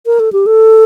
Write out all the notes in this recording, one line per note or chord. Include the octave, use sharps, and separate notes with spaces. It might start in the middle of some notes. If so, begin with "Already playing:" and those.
A#4
A4
G4
A4